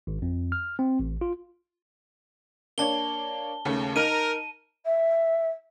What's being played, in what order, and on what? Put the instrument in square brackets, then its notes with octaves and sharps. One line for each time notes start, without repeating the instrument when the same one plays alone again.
[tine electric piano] G#1
F2
F6
C4
A1
F4
[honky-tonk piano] A#3 D4 C#5 [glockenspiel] A5 G7
[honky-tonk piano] D#2 C#3 A3
[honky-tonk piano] D#4 [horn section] A#4 [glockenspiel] D#7
[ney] E5